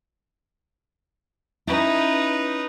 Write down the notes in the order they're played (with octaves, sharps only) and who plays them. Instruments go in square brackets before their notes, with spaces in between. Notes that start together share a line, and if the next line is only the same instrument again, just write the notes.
[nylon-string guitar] C#4 E4 [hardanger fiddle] D#4 B4